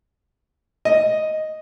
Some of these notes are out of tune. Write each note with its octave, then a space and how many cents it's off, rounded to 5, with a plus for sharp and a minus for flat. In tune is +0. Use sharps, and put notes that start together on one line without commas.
D#5 +0